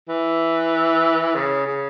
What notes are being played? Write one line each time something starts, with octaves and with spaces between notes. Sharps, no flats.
E3
C#3
C#3